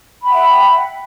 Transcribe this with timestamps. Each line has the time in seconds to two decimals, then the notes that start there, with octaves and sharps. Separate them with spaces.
0.22 B5
0.26 G5
0.30 F#5
0.34 E5